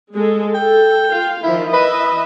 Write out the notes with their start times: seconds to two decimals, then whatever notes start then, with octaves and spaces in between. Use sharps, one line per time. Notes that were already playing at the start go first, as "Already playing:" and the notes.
0.14 G#3 A4
0.54 A4 G5
1.10 F4 F5
1.43 D#3 F3 E4
1.73 E3 B4 D#5 E5